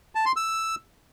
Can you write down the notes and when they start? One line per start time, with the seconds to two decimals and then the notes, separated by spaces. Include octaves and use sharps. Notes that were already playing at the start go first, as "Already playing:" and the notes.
0.15 A5
0.26 C6
0.36 E6